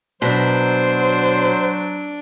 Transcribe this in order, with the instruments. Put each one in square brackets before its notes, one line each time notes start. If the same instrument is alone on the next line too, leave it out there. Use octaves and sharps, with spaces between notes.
[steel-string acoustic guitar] B2 [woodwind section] F#3 [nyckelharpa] D4 [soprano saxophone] C5